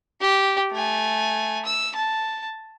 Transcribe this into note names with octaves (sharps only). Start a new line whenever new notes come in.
G4
A3 G#5
E6
A5